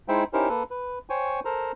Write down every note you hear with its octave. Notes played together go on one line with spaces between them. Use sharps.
G#3 D#4 E4 C5 E5 G5
C#4 D#4 E4 G4 A#4 C5
A#3 A4 B4
B4
C5 C#5 G5 G#5 C#6
A4 A#4 C5 A#5